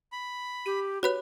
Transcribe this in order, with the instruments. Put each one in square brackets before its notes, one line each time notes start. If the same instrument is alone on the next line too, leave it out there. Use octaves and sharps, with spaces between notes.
[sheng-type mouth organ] B5
[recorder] G4 [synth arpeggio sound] D#7
[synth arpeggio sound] F#4 B4 [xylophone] C#5 B5 F#6